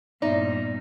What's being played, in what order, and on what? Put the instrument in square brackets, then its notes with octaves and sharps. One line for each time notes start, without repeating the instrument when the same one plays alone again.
[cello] G2 A#2 [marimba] B3 E5 [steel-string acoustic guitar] D#4 [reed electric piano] D5